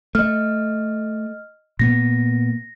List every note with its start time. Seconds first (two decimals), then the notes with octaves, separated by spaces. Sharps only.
0.15 A3 D#5 F6
1.79 A#2 A#3 B3 A#6